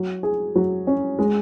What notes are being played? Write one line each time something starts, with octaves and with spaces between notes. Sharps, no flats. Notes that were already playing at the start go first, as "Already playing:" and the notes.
Already playing: F#3
G#4
F#3
C#4
G#3